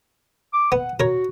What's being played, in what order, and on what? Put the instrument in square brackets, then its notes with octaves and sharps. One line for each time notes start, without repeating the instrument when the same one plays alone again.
[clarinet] D6
[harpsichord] B3 [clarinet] F#5
[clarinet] F#4 [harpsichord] A#4 C#5